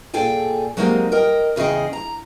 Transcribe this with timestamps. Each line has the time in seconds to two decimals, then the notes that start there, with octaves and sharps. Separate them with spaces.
0.14 A#2 G#4 A4 G5 G#5
0.77 F#3 G#3 A#3 C4 D#4 G4
1.12 A#4 D#5 G5
1.56 E2 C#3 G#4 D#5 G5
1.93 A#5